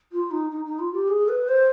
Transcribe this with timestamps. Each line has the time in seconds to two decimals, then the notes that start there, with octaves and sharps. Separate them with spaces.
0.12 F4
0.31 D#4
0.50 D#4
0.65 D#4
0.79 F4
0.93 G4
1.08 G#4
1.28 B4
1.48 C5